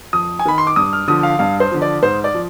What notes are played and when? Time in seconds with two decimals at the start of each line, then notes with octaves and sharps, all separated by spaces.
0.13 F2 D#6
0.39 G#5
0.45 D#3 B5
0.58 C6
0.67 D6
0.76 G2 D#6
0.93 F6
1.08 D3 F3 D#6
1.23 F5
1.39 G2 F5
1.60 C5
1.71 D3 F3
1.82 D5
2.02 G#2 C5
2.24 D5
2.34 F3